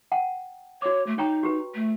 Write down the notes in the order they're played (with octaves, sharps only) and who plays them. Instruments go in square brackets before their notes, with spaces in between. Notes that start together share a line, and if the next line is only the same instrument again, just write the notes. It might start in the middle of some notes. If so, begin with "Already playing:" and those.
[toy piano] F#5 G5 A5
[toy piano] F#4 D6 [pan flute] C#5
[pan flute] A3
[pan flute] D#4 [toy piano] C#5 G5 A#5
[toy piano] F#4 G4 B4
[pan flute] A3